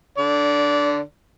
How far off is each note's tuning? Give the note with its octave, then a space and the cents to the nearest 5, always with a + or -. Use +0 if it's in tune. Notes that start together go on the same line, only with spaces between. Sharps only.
D3 +0 D5 -20